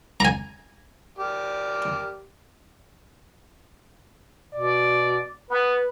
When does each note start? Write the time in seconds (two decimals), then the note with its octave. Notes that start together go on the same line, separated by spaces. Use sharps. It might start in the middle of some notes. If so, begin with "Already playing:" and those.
0.20 G#5 A#5
1.18 G4 A#4 D5
4.53 B2 D5
5.50 B3 B4